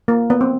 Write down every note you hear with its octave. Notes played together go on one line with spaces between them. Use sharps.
A#3
B3
C4